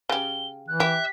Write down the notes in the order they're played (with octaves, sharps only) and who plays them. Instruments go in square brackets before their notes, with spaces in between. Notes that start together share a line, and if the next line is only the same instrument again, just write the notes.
[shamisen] C#3 G4 [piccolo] G7
[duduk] E3 [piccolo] F#6
[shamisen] G4 [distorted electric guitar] E5